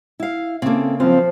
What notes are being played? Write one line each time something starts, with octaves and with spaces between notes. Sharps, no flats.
E4 F5
C#3 A#3 C4 A4
F3 C4 F4